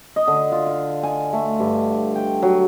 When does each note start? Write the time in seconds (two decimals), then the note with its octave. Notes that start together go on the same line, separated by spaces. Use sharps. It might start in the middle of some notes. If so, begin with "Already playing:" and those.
0.16 D#5
0.28 D3
0.52 F4
0.66 F5
1.03 G#5
1.33 A3
1.60 G2
2.15 G5
2.42 F#3